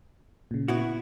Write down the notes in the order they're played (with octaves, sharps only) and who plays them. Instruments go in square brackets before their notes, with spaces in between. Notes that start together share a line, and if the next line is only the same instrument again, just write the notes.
[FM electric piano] A#2 C#3
[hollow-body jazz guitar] B3 E4 F#4